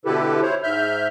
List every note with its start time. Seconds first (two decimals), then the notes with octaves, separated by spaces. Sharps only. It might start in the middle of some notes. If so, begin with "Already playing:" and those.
0.05 B2 D3 E4 G4 A4 B4
0.42 E4 C5 C#5
0.63 G#2 E5 F6 G6